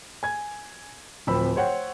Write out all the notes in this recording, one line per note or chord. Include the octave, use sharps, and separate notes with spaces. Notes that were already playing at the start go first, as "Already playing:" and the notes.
G#5 G#6
D1 F3 C4 B5 E6
C5 C#5 F#5 G5